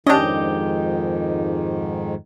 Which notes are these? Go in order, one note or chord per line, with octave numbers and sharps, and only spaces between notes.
F2 G#2 D#3 C#4 D4 G4 D#5